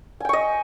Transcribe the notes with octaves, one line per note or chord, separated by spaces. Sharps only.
D#5 G5 G#5 C#6